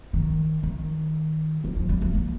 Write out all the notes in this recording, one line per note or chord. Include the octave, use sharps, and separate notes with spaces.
D#3
D#3
D#3
F3
G3
A3
A#3